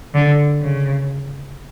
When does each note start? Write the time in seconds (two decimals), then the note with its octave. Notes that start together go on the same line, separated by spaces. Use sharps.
0.14 D3
0.61 C#3